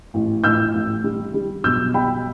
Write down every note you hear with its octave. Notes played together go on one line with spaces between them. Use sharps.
A1
A2 E6 G6
A1
G3
G3
B1 E6 G6
G3 G5 B5